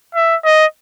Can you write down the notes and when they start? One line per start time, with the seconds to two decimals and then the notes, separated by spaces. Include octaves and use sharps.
0.15 E5
0.44 D#5